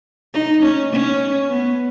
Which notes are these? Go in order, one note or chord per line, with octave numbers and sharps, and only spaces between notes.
D#4
C#4
C#4
B3